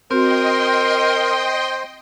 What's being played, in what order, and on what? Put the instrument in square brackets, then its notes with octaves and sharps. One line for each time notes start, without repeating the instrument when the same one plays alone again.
[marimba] C4 F#4 [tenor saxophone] A#4 [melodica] C5 [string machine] D#5 G5 C6